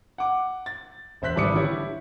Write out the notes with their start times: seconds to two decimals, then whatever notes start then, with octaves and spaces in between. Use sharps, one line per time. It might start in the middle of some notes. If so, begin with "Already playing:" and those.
0.18 F#5 D6
0.66 A6
1.22 E1 C5 E5 F#6 B6
1.36 G#1 E3 G3 D6 D#6 C#7
1.55 D3 E4 G4 C#5